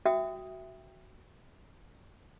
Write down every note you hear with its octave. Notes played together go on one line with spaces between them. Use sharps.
F#4 E5 G5 D#6